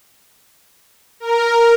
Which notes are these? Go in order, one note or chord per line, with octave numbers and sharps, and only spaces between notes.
A#4